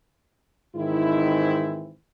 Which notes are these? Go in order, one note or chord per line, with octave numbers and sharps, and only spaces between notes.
G#2 D#3 E3 C4 E4